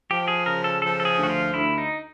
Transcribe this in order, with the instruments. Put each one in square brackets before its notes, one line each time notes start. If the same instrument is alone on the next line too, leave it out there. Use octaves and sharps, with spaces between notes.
[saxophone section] F3 [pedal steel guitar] G4
[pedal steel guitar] G#4
[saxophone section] C#3 [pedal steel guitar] A#4
[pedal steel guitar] A4
[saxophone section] F3 [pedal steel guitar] A4
[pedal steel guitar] A4
G#4
[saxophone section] D2
[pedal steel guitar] F#4
F4
[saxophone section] D2 [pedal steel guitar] E4
[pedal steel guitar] D#4